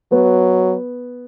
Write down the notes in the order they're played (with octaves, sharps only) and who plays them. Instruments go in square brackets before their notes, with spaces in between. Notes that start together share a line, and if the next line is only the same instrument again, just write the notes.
[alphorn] F#3 [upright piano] B3